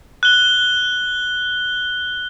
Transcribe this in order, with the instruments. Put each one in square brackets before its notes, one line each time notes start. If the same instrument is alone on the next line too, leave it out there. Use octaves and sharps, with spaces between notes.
[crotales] F#6 G7